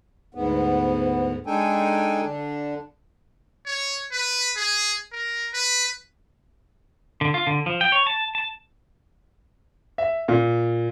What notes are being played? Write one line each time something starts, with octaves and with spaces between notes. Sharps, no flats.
D2 G#2 B3
G#3 D4 D#4 A4 G5 G#5
D3 D4
C#5
B4
G#4
A#4
B4
D3
F4
D3
F3
G5
C#5
A5
A5
E5
A#2